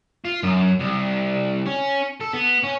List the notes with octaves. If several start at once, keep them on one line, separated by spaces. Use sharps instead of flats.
F4
F#2
C2
C#4
A4
B3
C#4